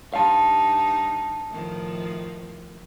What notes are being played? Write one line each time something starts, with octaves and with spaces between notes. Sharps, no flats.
G2 D#4 F5 A5
A2 D#3 F3